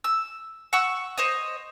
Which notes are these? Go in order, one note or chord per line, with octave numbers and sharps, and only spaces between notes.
E6
F#5 C#6 E6
C5 C#5 D#5